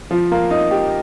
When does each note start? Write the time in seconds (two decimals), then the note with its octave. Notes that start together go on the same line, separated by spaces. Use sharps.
0.11 F3
0.32 A#3
0.51 D#4
0.71 G4